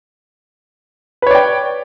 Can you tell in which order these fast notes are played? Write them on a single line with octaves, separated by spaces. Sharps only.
B4 C#5 D5 G5